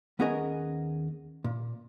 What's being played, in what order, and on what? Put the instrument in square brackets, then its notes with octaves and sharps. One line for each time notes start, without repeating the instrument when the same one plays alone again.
[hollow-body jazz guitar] D#2 B3 C#4 G#4 A#4 D#5
A#2